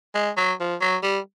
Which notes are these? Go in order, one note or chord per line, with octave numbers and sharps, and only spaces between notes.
G#3
F#3
F3
F#3
G3